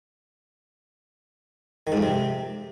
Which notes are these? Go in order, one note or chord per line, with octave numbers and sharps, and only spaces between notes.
D#3
G#2
F2
C3